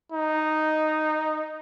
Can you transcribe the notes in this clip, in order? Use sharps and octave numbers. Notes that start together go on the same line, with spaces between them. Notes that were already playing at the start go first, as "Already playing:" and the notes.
D#4